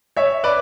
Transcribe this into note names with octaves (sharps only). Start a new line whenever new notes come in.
C#5 E5
B4 D5